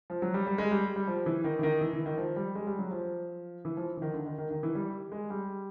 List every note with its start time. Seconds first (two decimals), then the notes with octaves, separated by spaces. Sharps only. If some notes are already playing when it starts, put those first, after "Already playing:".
0.10 F3
0.22 F#3
0.34 G3
0.47 G3
0.58 G#3
0.71 G3
0.96 G3
1.07 F3
1.26 E3
1.44 D#3
1.59 E3
1.63 D#3
1.81 E3
1.93 E3
2.06 D#3
2.18 F3
2.36 G3
2.55 G#3
2.67 G3
2.79 F#3
2.91 F3
3.65 E3
3.77 F3
3.97 E3
4.02 D#3
4.14 D3
4.26 D#3
4.38 D#3
4.51 D#3
4.63 E3
4.75 G3
5.12 G#3
5.30 G3